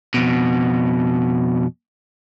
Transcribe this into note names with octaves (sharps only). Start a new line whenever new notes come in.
F2 B2